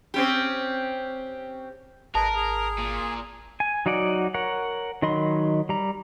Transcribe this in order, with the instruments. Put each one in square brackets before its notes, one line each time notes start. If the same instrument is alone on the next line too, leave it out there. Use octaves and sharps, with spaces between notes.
[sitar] C4 C#4 G4
[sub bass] G#1 [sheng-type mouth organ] G#4 B4 D#5 [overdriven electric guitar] A#4 [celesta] A5
[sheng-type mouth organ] G#4
[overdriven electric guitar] A#2
[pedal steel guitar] G#5
F#3 D#4 F#4 D5 F#5
A#4 C#5 F#5
D#3 F#3 D#5 B5 C6
G3 A#5